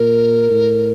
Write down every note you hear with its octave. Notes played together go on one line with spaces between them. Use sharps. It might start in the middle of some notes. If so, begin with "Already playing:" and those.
Already playing: A#2 A#4
A2